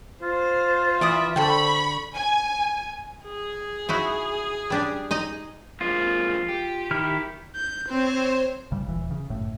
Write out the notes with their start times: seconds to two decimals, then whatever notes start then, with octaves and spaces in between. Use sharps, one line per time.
0.22 F4 C5
1.01 E3 D5 E5 B5 D#6
1.36 D3 A4 C5 G5 B5 C#6
2.16 G#5
3.24 G#4
3.89 D#4 E4 F#4
4.70 G3 D4 G4
5.11 D#4 D#5 A#5
5.81 F3 G#3 A#3 F4
6.49 G4
6.91 D#3 E4 F6
7.55 G6
7.89 C4 C5 C#5
8.71 G#1 C#3 G3
8.86 D#1 E3
9.11 C#3
9.29 F#1 A2 A3